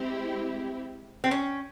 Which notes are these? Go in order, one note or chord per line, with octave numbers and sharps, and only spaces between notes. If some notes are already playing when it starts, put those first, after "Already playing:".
Already playing: G#3 C4 E4 G4
C4
C#4